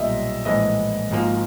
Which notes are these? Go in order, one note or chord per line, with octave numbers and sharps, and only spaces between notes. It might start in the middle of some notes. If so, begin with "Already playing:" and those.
Already playing: B1 A#2 G3 D#5 E5
A#1 A2 E3 G#3 D#5
G#1 G#2 F3 A#3